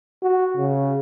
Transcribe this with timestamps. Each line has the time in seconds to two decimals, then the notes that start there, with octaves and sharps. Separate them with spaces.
0.23 F#4
0.57 C#3